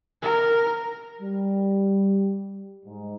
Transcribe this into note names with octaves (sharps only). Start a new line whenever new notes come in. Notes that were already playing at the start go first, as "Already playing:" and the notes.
A#4
G3
G#2